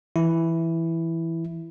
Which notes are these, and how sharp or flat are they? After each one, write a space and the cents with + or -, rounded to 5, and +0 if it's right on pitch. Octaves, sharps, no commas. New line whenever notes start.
E3 +0 E4 +0